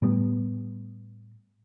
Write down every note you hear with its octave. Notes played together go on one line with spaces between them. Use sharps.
A2 G3 B3